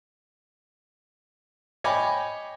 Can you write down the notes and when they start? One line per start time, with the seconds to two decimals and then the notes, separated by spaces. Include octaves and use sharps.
1.84 C#5 D#5 G5 G#5 B5 D6